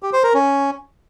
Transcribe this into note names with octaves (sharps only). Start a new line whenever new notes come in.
G4
C5
A#4
C#4